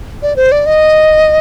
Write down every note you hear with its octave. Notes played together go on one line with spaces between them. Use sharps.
D5
C5
D5
D#5